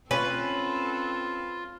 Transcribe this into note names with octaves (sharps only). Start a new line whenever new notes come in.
C4 C#4 F4 A4 B4